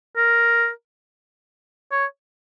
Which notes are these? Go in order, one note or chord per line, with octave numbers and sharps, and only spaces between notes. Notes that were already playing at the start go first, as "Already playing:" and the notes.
A#4
C#5